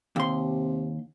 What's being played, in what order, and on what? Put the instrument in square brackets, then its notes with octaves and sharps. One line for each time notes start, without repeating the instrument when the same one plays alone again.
[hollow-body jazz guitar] D#2 C6 [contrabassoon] C3